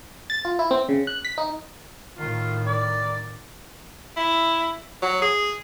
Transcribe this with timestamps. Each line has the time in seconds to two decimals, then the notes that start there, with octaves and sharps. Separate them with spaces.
0.30 A6
0.45 F4
0.59 E4
0.71 C4
0.89 C#3
1.07 F#6
1.25 B6
1.38 D#4
2.19 A2 D#3 F4
2.66 D5
4.17 E4
5.02 F#3
5.22 G#4